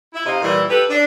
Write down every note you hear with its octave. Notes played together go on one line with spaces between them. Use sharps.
E4
C3 D#4 D#5 F5
A#2 E3 G3 E4
G4 A4 B4
D4